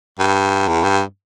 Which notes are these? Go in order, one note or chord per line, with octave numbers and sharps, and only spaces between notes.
G2
E2
G2